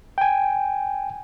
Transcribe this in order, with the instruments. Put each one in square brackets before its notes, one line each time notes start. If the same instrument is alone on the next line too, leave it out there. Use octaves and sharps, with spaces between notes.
[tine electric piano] G5 G#5